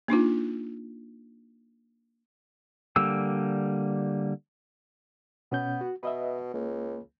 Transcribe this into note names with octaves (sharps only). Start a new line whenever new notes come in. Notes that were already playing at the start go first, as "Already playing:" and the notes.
A#3 D4 D#4 F4
D3 G3 A#3 E6
B2 B3 C#4 G6
F#4
B2 B4 D#5 E5
C#2 A#3